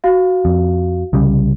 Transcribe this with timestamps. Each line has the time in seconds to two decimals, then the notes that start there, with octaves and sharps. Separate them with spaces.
0.04 F#4 F5
0.45 F2
1.13 C2 C#3 G3